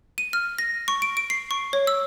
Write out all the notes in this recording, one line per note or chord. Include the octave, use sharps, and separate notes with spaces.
D#7
F6
A#6
C#6
D7
D7
C7
C#6
C#5
E6